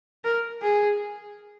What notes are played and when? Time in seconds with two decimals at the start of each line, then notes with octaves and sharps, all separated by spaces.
0.24 A#4
0.62 G#4